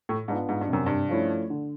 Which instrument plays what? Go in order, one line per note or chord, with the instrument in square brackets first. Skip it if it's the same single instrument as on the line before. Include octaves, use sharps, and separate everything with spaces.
[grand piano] A2
[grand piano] G#2 [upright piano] B3 D4 F4
[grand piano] G#2
G2
[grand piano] F#2 [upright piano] C3
[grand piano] G2
[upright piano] F3 A3 C#4 E4
D3